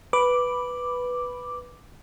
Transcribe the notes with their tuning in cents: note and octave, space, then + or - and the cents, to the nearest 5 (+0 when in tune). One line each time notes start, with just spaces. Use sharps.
B4 +0 B5 +0 D6 +0